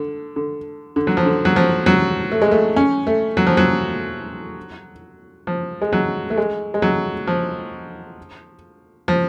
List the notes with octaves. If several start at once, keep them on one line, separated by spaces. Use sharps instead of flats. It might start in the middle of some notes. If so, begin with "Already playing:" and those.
Already playing: D3
D3
D3
F#3
F3
D3
F#3
F3
F#3
A3
G#3
A3
C#4
A3
F#3
F3
F#3
F3
G#3
F#3
A3
G#3
G#3
F#3
F3
F3